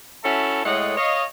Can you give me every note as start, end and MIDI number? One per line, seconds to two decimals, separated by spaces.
0.24 0.61 61
0.24 0.61 64
0.24 0.61 66
0.24 0.61 69
0.24 0.61 76
0.24 0.61 81
0.65 0.93 45
0.65 0.93 56
0.65 0.93 69
0.65 0.93 73
0.65 0.93 75
0.65 0.93 78
0.97 1.24 73
0.97 1.24 75
0.97 1.24 77